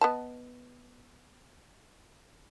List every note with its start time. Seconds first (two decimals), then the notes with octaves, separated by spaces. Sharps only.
0.01 B3 D#5 A5